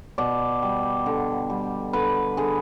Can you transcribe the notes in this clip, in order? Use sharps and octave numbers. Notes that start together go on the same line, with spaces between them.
B2 D5
G3
D3
G3
D3 B4
D3 G#4